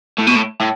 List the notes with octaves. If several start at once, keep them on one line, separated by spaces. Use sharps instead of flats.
A2
B2
A2
A2